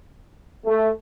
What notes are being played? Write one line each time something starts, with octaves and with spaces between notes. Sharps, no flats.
A3